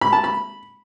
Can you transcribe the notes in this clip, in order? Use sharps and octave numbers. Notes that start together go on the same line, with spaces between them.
B5
A5
B5